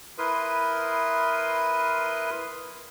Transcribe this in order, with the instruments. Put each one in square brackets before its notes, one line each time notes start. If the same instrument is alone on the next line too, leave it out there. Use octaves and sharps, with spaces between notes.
[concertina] E4 A#4 B4 C6 D#6